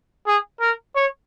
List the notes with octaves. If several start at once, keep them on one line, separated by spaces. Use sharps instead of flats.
G#4
A#4
C#5